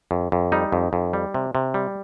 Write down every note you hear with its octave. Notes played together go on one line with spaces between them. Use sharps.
F2
F2
G3 D#4
F2
F2
G3
C3
C3
G3